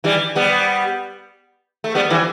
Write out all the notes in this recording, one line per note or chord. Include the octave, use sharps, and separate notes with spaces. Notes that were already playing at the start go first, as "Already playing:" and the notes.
E3 G3
G3 B3
A3
G3 B3
E3 G3